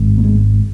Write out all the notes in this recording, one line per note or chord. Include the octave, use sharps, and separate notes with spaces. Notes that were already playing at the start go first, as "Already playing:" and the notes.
Already playing: G#1 G#2
A#3
G#3